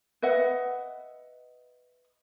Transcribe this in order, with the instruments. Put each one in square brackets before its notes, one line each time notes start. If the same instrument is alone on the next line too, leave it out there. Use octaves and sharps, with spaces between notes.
[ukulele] B4 D#5 E5 F#5